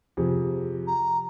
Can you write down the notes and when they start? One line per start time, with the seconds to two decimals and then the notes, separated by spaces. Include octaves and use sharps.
0.17 F2 C3 G#4
0.87 A#5